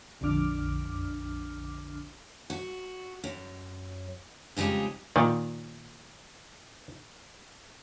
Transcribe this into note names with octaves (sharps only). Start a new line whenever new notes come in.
A#1 F2 D3 D4 D6 F6
F#4
F#2
F2 C#3 G#3 D#4 G4
A#2 D#3